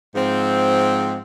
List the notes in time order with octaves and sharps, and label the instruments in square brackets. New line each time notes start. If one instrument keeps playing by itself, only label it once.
[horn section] G#2 F3 C4